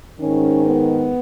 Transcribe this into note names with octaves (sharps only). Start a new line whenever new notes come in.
G#2 D#3 C#4
B3